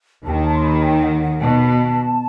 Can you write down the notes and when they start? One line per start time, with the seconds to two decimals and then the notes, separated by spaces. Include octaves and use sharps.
0.25 D#2 D#3 G5 A5
0.44 A5
0.55 C6
0.64 B5
0.83 G5
1.03 F#5
1.23 F#5
1.42 B2 A5